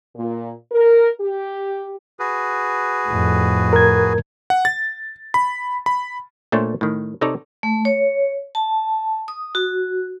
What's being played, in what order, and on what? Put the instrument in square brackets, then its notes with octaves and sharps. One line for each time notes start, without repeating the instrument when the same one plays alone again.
[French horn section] A#2
A#4
G4
[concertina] F#4 G#4 B4
[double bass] F2 A2
[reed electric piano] A#4 G#6
[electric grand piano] F#5
A6
B5
B5
[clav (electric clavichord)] A#2 A3 D4 A4 C5 C#5
A2 D#3
C3 D#4 A4 C#5 D5 A#5
[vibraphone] A3
C#5
A5
D#6
F#4